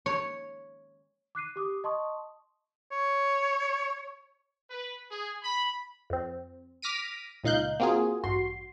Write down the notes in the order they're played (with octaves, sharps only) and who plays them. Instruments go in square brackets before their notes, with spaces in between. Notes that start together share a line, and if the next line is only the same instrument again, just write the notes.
[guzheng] C#5
[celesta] D6 F#6 C7 D#7
G4 D6 D#6
D#5 A5 C6 C#6 D#6
[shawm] C#5
[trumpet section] B4
G#4
B5
[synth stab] F2 C4
D6 F6 A#6 B6 D7 D#7
C#2 A#2 D#4 F5 F#6 G6
A#3 C4 F4 F#4 G#4
A1 G2 F#4 C6